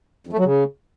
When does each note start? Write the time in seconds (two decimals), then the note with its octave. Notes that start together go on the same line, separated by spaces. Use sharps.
0.27 F2
0.33 A3
0.39 F#3
0.45 C#3